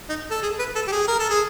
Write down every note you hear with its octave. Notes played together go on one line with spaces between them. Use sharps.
D#4
A4
G#4
B4
A4
G4
G#4
A#4
A4
G#4